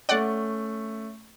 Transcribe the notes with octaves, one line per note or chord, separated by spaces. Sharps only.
A3 C#4 D5 F#5